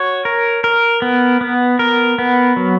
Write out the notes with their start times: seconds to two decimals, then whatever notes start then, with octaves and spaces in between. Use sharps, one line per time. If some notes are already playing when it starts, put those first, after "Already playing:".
Already playing: F#4 C#5
0.25 A#4
0.64 A#4
1.02 B3
1.41 B3
1.79 A#4
2.18 B3
2.56 F#3